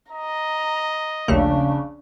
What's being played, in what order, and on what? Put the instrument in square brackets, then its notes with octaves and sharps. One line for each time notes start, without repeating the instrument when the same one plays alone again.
[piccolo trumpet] D#5 [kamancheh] A#5
[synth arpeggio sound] A#1 D#2 A3 [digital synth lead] C#3 [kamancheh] D4